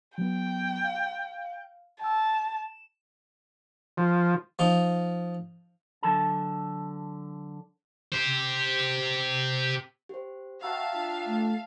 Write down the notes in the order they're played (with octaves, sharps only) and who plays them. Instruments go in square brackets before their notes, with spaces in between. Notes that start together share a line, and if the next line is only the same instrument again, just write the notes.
[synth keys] F#3 B3 [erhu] G5
[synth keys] F5
[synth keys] G5 E6 [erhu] A5
[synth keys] E7
[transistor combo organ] F3
[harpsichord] F3 D#4
[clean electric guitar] D3 F#3 A4 A5
[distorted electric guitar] G4 C5
[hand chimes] G4 C5
[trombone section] F#4 [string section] E5 F5 A5 [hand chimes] G5 A#5 E6
[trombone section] D4 F4
[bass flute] A3